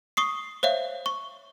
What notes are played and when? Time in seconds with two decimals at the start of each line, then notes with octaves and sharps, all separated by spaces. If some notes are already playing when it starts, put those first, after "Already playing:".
0.17 C#6 D#6 C7
0.63 C5 C#5 E5 F5
1.06 C#6